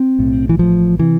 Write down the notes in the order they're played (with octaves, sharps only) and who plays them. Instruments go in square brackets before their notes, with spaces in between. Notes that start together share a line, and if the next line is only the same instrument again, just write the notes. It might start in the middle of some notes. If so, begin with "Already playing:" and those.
Already playing: [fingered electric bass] C4
B1 A2
E3
A1 A2 F3
C3 E3